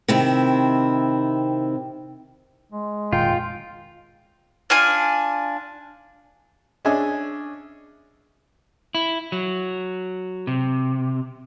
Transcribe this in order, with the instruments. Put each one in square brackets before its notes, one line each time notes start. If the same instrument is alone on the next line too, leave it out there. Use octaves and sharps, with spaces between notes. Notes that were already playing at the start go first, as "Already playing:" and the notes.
[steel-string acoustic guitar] C3 D#3 C4 E4
[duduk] G#3
[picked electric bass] F1 A#2 D#3 [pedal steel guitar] F4 [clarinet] G5
[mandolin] D4 F4 G#5
[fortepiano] C#4 D4 G#4 D#5 E5 G#5
[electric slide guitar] E4
F#3
C3